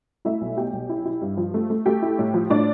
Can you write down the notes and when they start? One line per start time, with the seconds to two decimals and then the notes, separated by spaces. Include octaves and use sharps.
0.25 A3 E4 E5
0.41 B1
0.57 B2 G4 G5
0.73 B1
0.90 E4
1.05 E4
1.22 G2
1.37 F3
1.54 A3
1.70 A3
1.86 A3 G4 G5
2.02 E4
2.19 A2
2.34 F3
2.50 A2 D4 D5